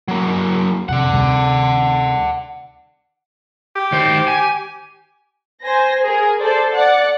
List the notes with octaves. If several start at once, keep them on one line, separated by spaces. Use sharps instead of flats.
F#3 A#3
F2 C3 D5 F#5
D2 C3 G3
G4
D#3 C5
G#5
C5 G#5 A#6
G#4 A#4
A4 C5 D5
D5 F#5